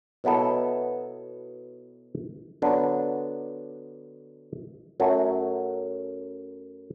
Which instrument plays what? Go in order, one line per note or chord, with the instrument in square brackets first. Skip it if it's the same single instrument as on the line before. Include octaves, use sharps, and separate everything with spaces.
[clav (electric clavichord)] B2 F#3 B3 E4 A4
D3 F#3 B3 D4
F#2 F#3 A3